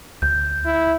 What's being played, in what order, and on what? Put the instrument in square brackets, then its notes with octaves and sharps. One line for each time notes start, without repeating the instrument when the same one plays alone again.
[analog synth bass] D2 [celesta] G6
[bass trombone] E4